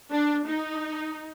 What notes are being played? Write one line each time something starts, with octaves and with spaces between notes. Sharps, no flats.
D4
D#4